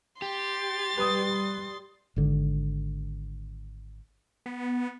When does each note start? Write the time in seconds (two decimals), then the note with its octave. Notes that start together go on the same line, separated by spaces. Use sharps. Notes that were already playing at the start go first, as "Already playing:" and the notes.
0.22 G4 C6 A6
0.98 G3 B4 D#6
2.16 G#1 D3
4.46 B3